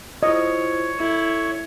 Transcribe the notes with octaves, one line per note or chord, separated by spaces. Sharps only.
E4 F4 C5 C#5 D#5
E4 A4